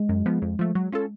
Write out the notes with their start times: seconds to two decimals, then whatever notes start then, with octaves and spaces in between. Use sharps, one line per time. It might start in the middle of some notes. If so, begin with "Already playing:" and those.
Already playing: G#3
0.09 F#2
0.26 F3 B3
0.42 F2
0.59 F3 A3
0.75 F#3
0.92 C#4 F4 A4